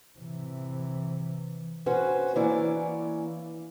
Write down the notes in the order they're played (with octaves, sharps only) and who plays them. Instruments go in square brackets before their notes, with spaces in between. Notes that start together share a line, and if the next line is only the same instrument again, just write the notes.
[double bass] C3 E3
[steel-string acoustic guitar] C#4 F#4 B4 C5
E3 A#3 C#4 E4 D5